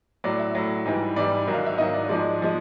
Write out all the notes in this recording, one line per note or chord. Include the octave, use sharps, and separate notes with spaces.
A2 F#3 D5
E5
A2 F#3
G#2 E3 G3
G#2 E3 G3 D5
G#2 D#3 F#3
F5
E5
G#2 D#3 F#3 D#5
D5
G#2 F3 G#3 D5
F3 G#3